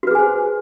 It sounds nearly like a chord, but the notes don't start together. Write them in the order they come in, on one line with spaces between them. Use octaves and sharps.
F#4 B4 G#4 G#5 C5